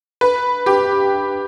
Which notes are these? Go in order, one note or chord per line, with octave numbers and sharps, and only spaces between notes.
B4
G4